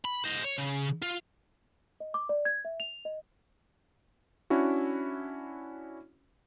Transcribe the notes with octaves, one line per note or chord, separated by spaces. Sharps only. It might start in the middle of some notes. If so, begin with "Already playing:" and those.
B5
C5 D#5
C#5
C#3
F4
D#5
D6
D5
G#6
E5
F7
D#5
C#4 D4 E4 F#4